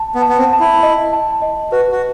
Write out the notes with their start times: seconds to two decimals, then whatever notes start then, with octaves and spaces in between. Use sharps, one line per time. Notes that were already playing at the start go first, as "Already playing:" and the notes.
Already playing: A5
0.15 B3
0.22 A5
0.29 B3
0.38 C4
0.53 A5
0.60 E4
0.83 D#5
1.13 A5
1.42 D#5
1.72 F#4 B4
1.92 F#4